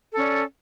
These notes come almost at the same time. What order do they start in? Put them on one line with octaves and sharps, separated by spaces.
A4 C#4 D5